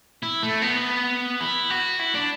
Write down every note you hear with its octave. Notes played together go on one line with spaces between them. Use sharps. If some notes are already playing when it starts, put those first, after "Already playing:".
E4
A3
B3
E4
F#4
E4
D4